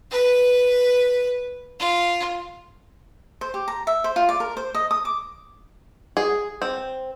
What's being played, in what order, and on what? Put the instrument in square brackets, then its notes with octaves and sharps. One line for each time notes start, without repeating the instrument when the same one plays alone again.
[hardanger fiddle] B4
F4
[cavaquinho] C5
G4
A#5
E5
C5
F4
D5
A#4
C5
D#5
D#6
D6
[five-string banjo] G#4
C4